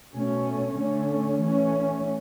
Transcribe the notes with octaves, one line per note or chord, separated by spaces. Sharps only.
B2 A3 C#4
D3 A3 C#4
E3 A3 C#4